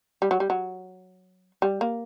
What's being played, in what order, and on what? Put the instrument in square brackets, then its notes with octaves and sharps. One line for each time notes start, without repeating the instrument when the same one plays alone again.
[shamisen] G3
F#3
G3
F#3
G3
A#3